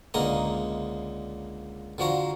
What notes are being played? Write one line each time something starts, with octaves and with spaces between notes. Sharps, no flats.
C#2 D3 A#3 D#5 A#5
D3 F3 F#4 A#5